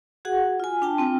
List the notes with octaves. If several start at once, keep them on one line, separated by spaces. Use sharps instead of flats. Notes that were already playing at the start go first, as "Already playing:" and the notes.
F#4 G#4 F#5
F4 G#5
D4 G5 A5
C4 F4 G5